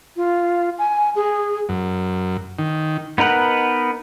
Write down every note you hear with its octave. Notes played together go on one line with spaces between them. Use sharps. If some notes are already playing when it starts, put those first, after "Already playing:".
F4
G#5
G#4
F#2
D#3
B3 D#4 A#4 B4 F#5